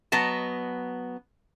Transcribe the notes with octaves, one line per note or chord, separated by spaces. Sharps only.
F#3 B3 D#5 A5